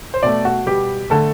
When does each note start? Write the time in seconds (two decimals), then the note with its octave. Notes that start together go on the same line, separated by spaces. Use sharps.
0.14 C5
0.23 B2 A3 D5
0.45 F#4
0.66 B2 G3 B3 G4
1.10 D3 A3 A4